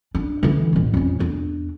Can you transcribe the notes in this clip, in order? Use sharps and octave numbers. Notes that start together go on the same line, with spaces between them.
D4
D3 E3
E1 A1
F2 C#4
E2 D4